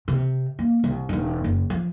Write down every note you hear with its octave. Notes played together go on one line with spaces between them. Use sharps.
C3
A#3
C2
E1 D#4
F#1
F3